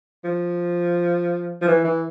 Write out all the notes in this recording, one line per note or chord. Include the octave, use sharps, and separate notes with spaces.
F3
F3
E3
E3